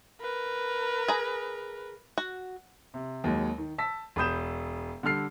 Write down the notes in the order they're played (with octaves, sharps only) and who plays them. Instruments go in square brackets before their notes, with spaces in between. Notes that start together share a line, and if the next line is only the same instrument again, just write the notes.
[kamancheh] A#4 B4
[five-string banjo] G#4 A#5
F#4
[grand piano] C3
D#2 F#3 G#3
D#3
A5 E6 B6
E1 B5 D#6 G6 E7
D3 G3 A4 F6 C7